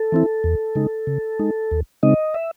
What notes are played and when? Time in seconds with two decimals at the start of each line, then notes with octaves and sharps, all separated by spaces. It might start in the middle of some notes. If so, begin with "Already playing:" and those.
Already playing: A4
0.12 E3 C4 E4
0.44 E2
0.75 C#3 G#3 D#4
1.07 C#3
1.39 G#3 D#4
1.71 D#2
2.03 C#3 G#3 C4 D#4 D#5
2.34 E5